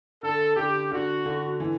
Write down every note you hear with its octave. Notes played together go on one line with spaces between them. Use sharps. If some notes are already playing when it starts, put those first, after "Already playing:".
D3 A4
D3 G4
D3 F#4
D3
E3